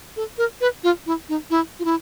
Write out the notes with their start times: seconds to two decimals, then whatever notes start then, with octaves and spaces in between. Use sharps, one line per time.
0.16 A4
0.38 A#4
0.61 B4
0.84 F4
1.07 E4
1.29 D#4
1.50 E4
1.79 F4
1.85 E4